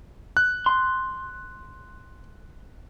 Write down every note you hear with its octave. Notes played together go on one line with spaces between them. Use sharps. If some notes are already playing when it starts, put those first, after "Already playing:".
F#6
C6